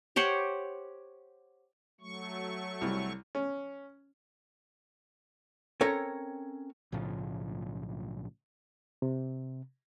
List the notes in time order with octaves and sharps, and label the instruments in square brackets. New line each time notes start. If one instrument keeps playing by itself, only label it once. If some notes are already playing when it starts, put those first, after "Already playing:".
[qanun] G4 C5 C#5 F#5
[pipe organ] F#3 A3 C#6
[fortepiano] C2
C#4
[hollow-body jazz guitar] C4 C#4 A4 A#4 C#5
[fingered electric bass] B1 A2 C#3 F3
[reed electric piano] C3